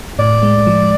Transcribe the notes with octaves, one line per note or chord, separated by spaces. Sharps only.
A2 D5
G#3
F3